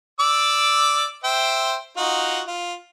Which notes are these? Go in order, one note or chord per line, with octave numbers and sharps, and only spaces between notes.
D5 D6 E6
C5 E5 G5
D#4 F4 F#4
F4